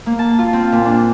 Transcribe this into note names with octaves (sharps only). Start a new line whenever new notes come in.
A#3
A5
F4
C4
A#2
D4